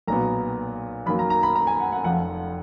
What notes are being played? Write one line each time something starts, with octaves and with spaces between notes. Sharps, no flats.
B1 A#2 F#3 B3 A#5
F#2 D#3 F#3 A#3 B5
A#5
A#5
B5
A#5
G#5
F#5
F#5
F1 F2 F3 F#5